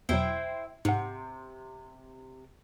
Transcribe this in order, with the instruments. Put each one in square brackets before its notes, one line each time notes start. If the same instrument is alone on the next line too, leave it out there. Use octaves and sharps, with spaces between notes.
[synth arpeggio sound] E2 B2 F#3 [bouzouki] E4 C5 G5
[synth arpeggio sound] G#2 F#5 [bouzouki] C3